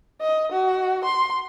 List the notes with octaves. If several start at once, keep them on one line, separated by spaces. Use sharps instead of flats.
D#5
F#4
C6